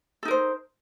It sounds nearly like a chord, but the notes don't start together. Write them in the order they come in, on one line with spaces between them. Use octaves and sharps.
A4 D#4 A#4 C5